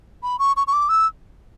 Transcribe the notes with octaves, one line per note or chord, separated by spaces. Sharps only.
B5
C#6
C#6
C#6
D6
E6